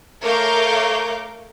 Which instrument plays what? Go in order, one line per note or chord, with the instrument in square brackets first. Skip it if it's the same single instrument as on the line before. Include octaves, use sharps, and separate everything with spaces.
[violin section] A3 A#4 C#5 F5 D6 G6